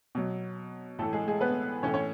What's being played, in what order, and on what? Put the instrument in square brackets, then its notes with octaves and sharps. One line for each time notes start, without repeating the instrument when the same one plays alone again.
[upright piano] B2 F#3
A2 E3 A3 A4
G#3 G#4
G#3 G#4
B3 B4
E3 C#4 C#5
A2
C#4 C#5